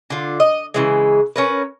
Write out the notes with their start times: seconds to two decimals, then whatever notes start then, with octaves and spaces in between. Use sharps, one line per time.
0.10 D3 F4
0.40 D#5
0.74 C#3 E3 G#3
1.36 C#4 A#4 B4